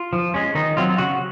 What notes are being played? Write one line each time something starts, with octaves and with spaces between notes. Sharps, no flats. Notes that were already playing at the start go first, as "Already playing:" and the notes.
Already playing: F4
F3
G#3 C#4
D#3 D#4
F#3 C4 F4
C#3 F#4